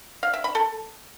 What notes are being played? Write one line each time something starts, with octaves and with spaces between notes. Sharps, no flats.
F5
E5
B5
A4